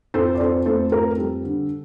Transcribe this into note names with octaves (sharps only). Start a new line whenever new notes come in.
F2 A4 C5
D5
F2 A4 C5
A3 A4 C5
F2 A#4
G3 A4
D3